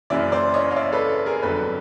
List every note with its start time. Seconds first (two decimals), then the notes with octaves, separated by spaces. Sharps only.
0.10 F#1 F#2 C#3 E3 D5 E5
0.32 C5 D5
0.54 C#5 D#5
0.71 F5
0.76 D5 E5
0.93 A4 B4
1.26 G#4 A#4
1.42 G1 F2 D3 F#3 A4 B4